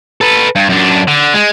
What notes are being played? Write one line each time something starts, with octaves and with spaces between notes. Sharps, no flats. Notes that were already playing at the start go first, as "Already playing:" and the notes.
A4 B4
G2
F#2 D4
D3
G#3